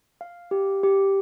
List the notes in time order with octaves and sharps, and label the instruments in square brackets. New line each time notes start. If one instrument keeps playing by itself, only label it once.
[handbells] F5
G4
G4